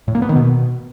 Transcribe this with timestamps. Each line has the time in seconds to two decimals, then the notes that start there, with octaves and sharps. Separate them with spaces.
0.08 A2
0.15 A#3
0.22 B3
0.29 D#3
0.36 B2